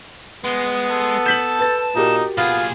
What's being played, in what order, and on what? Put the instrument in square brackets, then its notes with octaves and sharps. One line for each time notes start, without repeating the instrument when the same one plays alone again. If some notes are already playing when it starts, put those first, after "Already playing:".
[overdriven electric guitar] G#3 [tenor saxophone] B3
[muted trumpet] A4
[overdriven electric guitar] A5 [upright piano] G6 B6 F#7
[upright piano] B4 A6
[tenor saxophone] A#2 [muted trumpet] D#4 [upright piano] F#4 G4 A#4
[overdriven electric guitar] A#2 G#4 [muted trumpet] B3 [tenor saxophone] F4